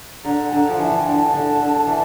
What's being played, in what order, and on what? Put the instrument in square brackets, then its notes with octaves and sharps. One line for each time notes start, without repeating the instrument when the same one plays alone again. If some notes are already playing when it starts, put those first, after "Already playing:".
[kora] D3 [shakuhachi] A#5
[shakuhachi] G5
[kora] D3 [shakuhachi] A5
[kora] F3
[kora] E3 [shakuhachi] A5
[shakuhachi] G5
[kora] D3 [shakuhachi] A5
[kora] D3
D3
E3